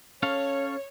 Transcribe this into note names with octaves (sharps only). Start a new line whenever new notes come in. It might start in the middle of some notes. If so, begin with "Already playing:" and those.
C#4 A4 C#5 F5